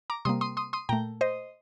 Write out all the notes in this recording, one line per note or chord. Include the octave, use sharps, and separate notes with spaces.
A#5 D6
C3 G3 A#3 C6 D#6
C6 D#6
C6 D#6
C6 D#6
A#2 A3 G5 A#5
C5 D#5